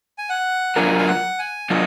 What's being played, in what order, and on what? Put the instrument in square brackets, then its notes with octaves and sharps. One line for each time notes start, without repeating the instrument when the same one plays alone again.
[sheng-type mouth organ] G#5
F#5
[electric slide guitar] F#3 D4 F4 A#4 [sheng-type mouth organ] G#5
[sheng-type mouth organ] F5
F#5
G#5
[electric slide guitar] F#3 D4 F4 [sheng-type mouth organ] D#5